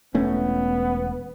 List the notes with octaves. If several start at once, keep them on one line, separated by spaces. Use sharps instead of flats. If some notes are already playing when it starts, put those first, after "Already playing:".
E1 A3 B3 C#4